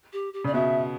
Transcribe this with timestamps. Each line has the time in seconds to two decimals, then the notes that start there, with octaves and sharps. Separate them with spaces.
0.13 G4
0.33 G4
0.44 C#3 D5
0.53 B2 E5